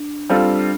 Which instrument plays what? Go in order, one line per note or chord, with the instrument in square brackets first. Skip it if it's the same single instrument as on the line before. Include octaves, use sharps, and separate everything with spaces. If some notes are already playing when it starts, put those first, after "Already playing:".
Already playing: [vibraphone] D4
[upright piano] G3 C4 F4 A4 [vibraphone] D4